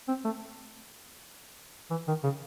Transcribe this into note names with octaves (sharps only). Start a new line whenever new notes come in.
C4
A3
E3
D#3
C#3